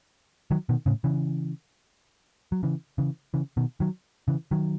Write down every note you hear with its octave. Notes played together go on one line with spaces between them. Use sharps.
D#3 F#3
B2 D#3
A2 C#3
C#3 E3
F#3
C#3 E3
C#3 E3
C#3 E3
B2 D#3
D#3 F#3
C#3 E3
D#3 F#3